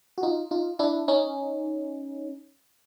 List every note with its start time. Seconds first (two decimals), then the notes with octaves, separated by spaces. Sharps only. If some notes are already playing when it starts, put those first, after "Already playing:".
0.18 F#4
0.23 D#4 F4
0.51 D#4 F4
0.79 D4 E4
1.08 C#4 D#4